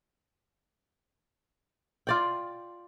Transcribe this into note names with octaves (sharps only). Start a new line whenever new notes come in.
F4 D5 G5